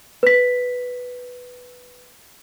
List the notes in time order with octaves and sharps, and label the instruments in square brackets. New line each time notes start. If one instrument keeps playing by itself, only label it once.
[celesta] B4 B6